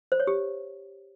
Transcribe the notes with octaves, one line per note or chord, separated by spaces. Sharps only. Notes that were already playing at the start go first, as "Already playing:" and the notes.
C5
C#5
G4